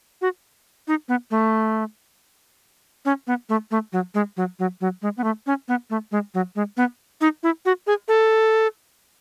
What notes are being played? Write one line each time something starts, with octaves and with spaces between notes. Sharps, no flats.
F#4
D#4
B3
A3
C#4
B3
A3
A3
F#3
G#3
F#3
F#3
F#3
G#3
B3
A3
C#4
B3
A3
G#3
F#3
G#3
B3
D#4
E4
F#4
G#4
A4